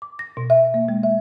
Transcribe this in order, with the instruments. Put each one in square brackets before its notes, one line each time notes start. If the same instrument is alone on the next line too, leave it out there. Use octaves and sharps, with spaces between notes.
[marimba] D6
A#6
B2
E5
A#3
G#3
E5